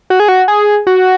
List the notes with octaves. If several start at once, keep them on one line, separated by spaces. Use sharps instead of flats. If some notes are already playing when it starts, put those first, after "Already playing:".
F#4
G#4
F#4
G#4
F#4